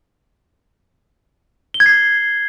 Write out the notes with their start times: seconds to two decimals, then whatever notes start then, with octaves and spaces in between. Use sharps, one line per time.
1.74 G7
1.80 G#6
1.86 C7